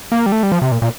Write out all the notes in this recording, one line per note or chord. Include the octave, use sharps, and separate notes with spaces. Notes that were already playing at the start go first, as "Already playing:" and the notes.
A#3
G3
A3
G3
F3
C3
A#2
A#2